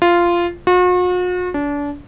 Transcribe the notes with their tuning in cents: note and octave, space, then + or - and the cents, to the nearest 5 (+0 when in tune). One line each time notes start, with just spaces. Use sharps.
F4 -10
F#4 -45
D4 -30